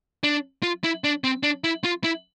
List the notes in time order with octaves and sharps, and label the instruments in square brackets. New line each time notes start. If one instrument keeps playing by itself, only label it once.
[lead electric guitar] D4
F4
E4
D4
C4
D4
E4
F4
E4